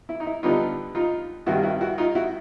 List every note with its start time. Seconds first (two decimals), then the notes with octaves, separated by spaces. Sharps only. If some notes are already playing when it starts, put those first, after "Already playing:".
0.09 E4
0.20 D#4
0.26 E4
0.43 D3 G3 B3 D#4 F4
0.95 D#4 F4
1.46 G2 D#3 G3 C4 E4 F#4
1.63 E4 F#4
1.81 E4 F#4
1.98 D#4 F4
2.15 E4 F#4